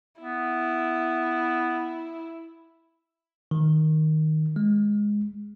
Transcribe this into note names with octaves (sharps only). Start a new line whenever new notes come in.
B3 E4
D#3
G#3